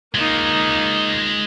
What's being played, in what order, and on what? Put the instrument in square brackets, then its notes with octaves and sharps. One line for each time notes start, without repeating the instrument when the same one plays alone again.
[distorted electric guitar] G#3 F4 [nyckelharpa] A#3 D#4